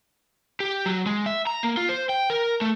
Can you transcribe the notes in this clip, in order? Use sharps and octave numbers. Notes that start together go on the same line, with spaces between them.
G4
F#3
G#3
E5
A#5
A#3
F4
C5
G5
A#4
A3